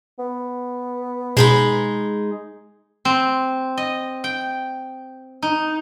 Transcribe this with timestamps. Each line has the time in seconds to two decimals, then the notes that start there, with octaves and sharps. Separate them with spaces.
0.19 B3
1.37 B2 G#3 D#4 B5
3.05 C4
3.78 D#5
4.24 G5
5.42 D#4